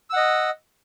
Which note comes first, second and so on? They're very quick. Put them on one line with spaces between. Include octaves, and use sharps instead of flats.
E6 F#5 D#5